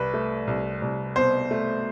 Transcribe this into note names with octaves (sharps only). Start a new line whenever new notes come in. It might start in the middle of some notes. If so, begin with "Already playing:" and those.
Already playing: C2 B4
A3
C2
C2
B2 C5
A3